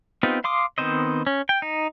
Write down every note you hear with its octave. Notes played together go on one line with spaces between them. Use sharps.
B3 C4 D#4 F4 G4
F5 C6 D6 D#6
D#3 B3 C4 C5 D#5
C#4
G5
D#4